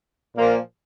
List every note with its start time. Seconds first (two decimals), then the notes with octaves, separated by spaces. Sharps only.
0.36 A#2 F3 A#3